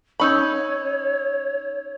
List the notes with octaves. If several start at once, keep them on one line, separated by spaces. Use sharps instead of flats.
C#4 D#4 C#5 B5 C#6 E6 G6